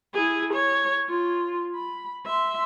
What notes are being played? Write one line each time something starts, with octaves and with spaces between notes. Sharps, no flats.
E4 G#4
C#5
F4
B5
E5 C6